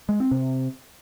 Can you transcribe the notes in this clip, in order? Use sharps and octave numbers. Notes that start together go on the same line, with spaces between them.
G#3
C4
C3